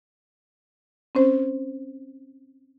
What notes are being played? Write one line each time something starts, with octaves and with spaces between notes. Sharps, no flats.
C4 C#4 C5